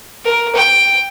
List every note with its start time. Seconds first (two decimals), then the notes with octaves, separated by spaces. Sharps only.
0.25 A#4
0.55 G5